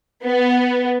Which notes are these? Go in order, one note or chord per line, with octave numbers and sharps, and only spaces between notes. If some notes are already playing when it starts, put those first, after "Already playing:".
B3